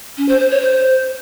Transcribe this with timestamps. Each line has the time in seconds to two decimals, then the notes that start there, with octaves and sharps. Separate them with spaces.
0.18 C#4
0.29 C5
0.40 C5
0.51 C#5
0.62 C5